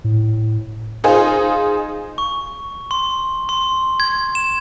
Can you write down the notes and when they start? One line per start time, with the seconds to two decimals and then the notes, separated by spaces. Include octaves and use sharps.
0.04 A2
1.04 D#4 F4 G#4 C5
2.18 C#6
2.91 C6
3.49 C6
4.00 G#6
4.35 E7